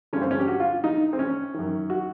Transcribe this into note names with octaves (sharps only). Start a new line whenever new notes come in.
G2 D3 C#4
C4
C#4
G4
F#4
F4
D#4
C4
C#4
F#2 D#3
F#4